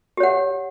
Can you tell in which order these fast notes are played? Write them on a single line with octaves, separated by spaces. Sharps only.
G4 C#5 F#5